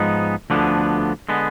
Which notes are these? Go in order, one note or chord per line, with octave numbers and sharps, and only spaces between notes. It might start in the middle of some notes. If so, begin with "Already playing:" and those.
Already playing: G#2 F3 G#3 B3 D#4
D2 D3 F3 B3 D4
D3 G#3 B3